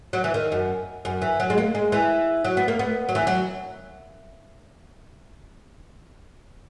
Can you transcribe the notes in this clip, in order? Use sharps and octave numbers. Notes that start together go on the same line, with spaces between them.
F#3
E3
D#3
F#2
F#2
E3
F#3
G#3
A#3
G#3
E3
F#3
B3
A#3
B3
F#3
E3
F#3